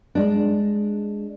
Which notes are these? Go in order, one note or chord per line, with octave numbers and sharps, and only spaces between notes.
G#3 D4